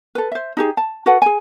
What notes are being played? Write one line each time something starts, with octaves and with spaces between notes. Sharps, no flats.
A4 B4
C5 E5
D#4 G4 G#4
A5
F#4 A4 B4 F#5
G#4 G#5